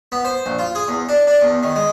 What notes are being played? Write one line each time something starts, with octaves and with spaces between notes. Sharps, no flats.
B3
C5
A#1
F4
G#4
E2
D4
D4
E2
D#3
G#3